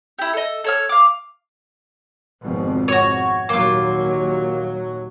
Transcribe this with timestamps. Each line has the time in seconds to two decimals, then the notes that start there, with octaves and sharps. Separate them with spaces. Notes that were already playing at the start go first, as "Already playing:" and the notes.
0.18 E4 G4
0.33 A4 D#5
0.64 A4 C#5 F6
0.89 F5 D6
2.43 G#1 F2 B2
2.88 F#4 C#5
3.49 D#2 A#2 F#3 A#3 F4